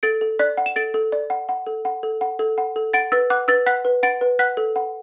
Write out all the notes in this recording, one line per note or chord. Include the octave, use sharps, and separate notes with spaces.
A4 A6 D7
A4
D5 F#6 B6
F#5
E7
A4 A6 D7
A4
D5
F#5
F#5
A4
F#5
A4
F#5
A4
F#5
A4
F#5 A6 D7
B4 E6 A6
F#5 D6 F#6
B4 E6 A6
F#5 F#6 B6
B4
F#5 A6 D7
B4
F#5 F#6 B6
A4
F#5